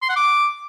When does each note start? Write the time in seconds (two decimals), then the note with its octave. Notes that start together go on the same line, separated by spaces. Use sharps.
0.02 C6
0.09 F#5
0.16 D6